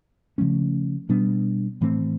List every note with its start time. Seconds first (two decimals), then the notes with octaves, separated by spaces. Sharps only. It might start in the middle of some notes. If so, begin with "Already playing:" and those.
0.38 C#3 F3 A3 C#4
1.09 B2 G3 B3 D4
1.81 A2 E3 A3 C4